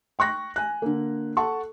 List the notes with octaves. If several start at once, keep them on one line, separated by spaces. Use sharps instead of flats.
G5 C#6 F#6 A#6
G#5 F#6
D3 A#3
A4 F#5 A5 C#6